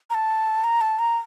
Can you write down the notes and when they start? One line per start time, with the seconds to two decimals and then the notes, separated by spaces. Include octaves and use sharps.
0.10 A#5
0.15 A5
0.64 A#5
0.81 A5
0.99 A#5